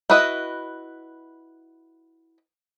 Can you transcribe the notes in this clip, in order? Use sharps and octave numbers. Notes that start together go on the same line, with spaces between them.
E4 F#4 B4 D#5